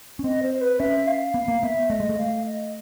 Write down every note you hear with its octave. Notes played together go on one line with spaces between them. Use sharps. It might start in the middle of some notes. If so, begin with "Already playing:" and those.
C#4
C4 D#5
C5
B4
C#4 E5
F5
B3 F5
A#3
B3 E5
A3 D#5
G#3
A3
F5
D#5